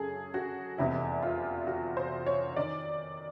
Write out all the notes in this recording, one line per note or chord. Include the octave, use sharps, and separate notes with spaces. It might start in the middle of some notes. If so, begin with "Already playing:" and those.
Already playing: F#2 C#3 G#4 A4
F#4
F1 E2 C3 E4
F4
F#4
C5
C#5
D#3 D5